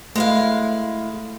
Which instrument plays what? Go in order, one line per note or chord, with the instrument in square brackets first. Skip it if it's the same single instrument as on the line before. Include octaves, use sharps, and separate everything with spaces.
[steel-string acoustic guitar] G#3 E4 F5 [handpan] A3